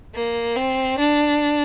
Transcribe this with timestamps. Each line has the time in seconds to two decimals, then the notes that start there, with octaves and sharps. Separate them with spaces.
0.15 A#3
0.56 C4
0.98 D4